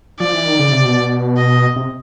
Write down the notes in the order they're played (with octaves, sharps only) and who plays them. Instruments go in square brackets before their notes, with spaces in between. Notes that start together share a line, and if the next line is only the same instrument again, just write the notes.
[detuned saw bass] F3 [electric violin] D5
[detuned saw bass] E3
D#3
C#3
C3
B2
[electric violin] D#5
[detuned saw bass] C3